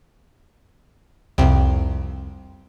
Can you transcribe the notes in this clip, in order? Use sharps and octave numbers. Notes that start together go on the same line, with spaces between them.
C2 F2 C3